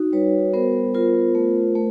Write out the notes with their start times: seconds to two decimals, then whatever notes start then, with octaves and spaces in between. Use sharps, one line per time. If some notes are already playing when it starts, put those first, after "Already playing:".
Already playing: D#4 F#4
0.13 G3 B4 C#5
0.54 B3 A#4 C5
0.95 F4 A#4 C5
1.35 A3
1.75 A3